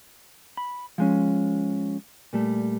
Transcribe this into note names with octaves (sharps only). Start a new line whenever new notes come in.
B5
F3 G#3 C#4
A#2 G3 A3